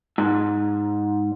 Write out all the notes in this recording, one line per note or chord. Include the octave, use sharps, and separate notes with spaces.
G#2